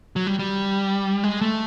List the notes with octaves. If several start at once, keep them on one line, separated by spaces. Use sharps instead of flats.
F#3
G3
G3
G#3
A3